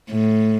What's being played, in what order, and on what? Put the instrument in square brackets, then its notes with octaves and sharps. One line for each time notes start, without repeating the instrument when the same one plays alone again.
[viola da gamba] A2